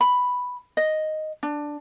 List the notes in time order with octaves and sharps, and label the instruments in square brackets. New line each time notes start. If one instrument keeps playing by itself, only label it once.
[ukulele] B5
D#5
D4